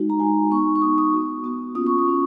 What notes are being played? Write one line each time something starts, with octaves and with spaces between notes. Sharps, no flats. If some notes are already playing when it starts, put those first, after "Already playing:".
Already playing: G#3 D#4 F#4
A#5
G#3 D#4 F#4 G#5
B3 D#4 F#4 C#6
C#6
B3 D#4 F#4 D#6
D#6
B3 F#4
B3 F#4
A#3 C#4 F4 D#6
C#6
D#6
A#3 C#4 F4